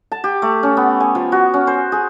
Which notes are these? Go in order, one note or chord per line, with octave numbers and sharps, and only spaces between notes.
A5
G4
A3
C#4
B3
G#5
F3
F#4
C#4
C5
G#4